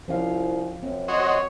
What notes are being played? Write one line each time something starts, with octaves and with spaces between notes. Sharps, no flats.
C2 F3 C#4 F5
F#2 C4
F#4 C5 C#5 D#5